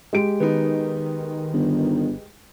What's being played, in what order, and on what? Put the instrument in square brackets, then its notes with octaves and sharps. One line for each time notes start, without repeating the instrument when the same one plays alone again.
[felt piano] G#3 G4 D7
[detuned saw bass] D#3 [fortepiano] B3 D#4
[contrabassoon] G1